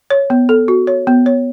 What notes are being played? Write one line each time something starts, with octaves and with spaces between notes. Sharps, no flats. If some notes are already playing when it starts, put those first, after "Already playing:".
C#5
B3
A4
F#4
C#5
B3
C#5